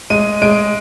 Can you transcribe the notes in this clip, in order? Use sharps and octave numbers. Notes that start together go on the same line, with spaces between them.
G#3 D#7
G#3 D7